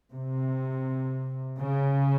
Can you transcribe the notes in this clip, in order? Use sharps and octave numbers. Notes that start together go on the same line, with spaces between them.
C3
C#3